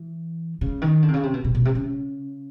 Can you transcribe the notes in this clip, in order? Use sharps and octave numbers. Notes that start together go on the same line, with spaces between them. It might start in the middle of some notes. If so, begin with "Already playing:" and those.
Already playing: E3
C#3
D#3
D3
C3
C#3
C3
B2
B2
B2
C3
C#3